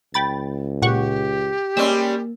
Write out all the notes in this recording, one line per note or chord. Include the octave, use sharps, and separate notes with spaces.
C#2 G5 B5 A6
A#2 G4 F#5 C#6
G3 G#3 A#3 C#4 E6